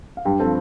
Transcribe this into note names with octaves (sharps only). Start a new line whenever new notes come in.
F5
G2 G4 G5
F3 C4 A4 A5